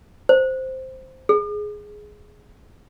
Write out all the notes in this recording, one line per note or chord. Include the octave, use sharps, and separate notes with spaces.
C5
G#4